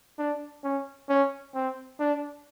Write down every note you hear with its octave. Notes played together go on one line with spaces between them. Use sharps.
D4
C#4
C#4
C4
D4